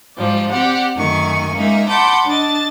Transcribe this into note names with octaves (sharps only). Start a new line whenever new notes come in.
G#2 F3 G3 D5
C4 G4 D5 F#5
F#2 D#3 A3 G#5 C#6
G#3 A#3 C#4 D#4 A#4 E5
F#5 A5 B5 C6 D6 G6
D4 D#5 A5 A6